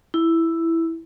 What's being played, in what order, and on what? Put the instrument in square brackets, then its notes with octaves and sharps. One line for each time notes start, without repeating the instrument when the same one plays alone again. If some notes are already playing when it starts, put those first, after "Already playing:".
[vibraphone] E4